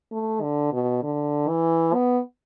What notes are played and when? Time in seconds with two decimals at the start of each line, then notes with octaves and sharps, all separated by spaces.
0.12 A3
0.42 D3
0.73 B2
1.03 D3
1.49 E3
1.94 B3